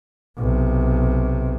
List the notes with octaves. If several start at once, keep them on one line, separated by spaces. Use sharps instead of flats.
B1 C3